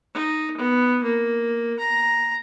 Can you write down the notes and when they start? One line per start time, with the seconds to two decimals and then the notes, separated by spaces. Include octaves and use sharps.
0.14 D#4
0.57 B3
1.03 A#3
1.79 A#5